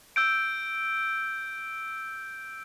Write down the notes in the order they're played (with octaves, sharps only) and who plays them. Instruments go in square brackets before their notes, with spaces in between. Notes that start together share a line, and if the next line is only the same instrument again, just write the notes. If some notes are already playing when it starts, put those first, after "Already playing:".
[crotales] E6 G6 D7